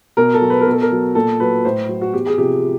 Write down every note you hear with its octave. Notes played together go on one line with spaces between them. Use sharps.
B2 A#4
A4
F#3
B4
A#4
B2
A4
A#4
F#3
A#2 A4
F#3 B4
A2 C5
F#3
F#4
E2 G4
G#4
C3 F3 G4